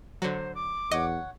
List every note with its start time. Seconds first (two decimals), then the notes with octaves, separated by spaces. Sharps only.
0.22 D3 F#3 C5
0.55 D6
0.91 E2 C#5 D#5 F#5